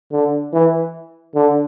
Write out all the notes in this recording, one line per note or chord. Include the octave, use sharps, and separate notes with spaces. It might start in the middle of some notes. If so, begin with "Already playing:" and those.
D3
E3
D3